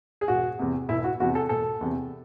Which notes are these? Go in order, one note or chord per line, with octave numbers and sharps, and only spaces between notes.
G#4
E1 F#4
E2 C3
E1 E4
F#4
E2 C3 F#4
A4
E1 A4
E2 C3